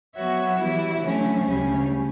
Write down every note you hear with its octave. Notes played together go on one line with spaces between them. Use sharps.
F#3 B3 F#4 C#5 E5
E3 G3 B3 E4
D3 F#3 A3 C#4
D2 C#3 G3 C#4